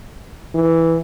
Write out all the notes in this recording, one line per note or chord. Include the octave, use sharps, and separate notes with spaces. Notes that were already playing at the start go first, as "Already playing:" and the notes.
E3